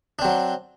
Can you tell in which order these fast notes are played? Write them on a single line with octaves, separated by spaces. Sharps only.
D4 C4 F#3